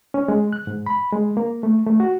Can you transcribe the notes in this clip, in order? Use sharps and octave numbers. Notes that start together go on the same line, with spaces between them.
C#4
G#3
F#6
G#2
B5
G#3
A#3
A3
A3
F#4